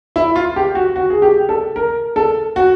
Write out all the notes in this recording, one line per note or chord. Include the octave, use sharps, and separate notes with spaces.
E4
F4
G4
F#4
F#4
G#4
G4
A4
A#4
A4
F#4